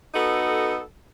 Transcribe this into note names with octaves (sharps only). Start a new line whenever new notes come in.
B3 D#4 F#4 A4